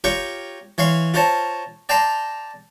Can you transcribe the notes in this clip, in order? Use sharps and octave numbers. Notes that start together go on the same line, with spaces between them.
F4 G4 A#4 C#5 G5 C#6
E3 C#5 F5 C6 C#6
F4 A#4 C5 C#5 A5
D5 G5 A5 A#5 C6